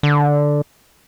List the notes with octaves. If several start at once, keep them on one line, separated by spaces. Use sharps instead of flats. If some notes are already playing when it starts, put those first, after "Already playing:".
D3